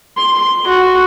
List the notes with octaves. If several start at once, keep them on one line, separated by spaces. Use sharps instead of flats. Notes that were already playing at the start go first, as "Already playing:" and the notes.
C6
F#4